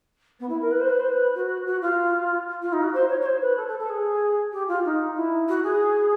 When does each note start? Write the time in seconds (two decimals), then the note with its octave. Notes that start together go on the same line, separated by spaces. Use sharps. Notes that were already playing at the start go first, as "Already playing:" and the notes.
0.39 B3
0.49 E4
0.61 A#4
0.71 B4
0.80 C5
0.89 B4
0.99 C5
1.09 B4
1.34 F#4
1.66 F#4
1.81 F4
2.62 F4
2.72 D#4
2.82 F#4
2.93 C5
3.09 C#5
3.20 C#5
3.25 C5
3.41 B4
3.56 A4
3.67 A4
3.79 A4
3.89 G#4
4.52 G4
4.68 F4
4.85 D#4
5.15 E4
5.48 F#4
5.63 G#4